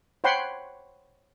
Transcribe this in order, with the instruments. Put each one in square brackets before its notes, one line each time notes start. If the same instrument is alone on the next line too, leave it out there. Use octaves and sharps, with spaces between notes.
[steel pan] C5 C#5 F#5 G5 B5 C6